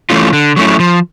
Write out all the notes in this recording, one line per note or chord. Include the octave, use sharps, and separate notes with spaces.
E3 A3 C#4 F4
D3
F#3 A3 C#4 E4
F3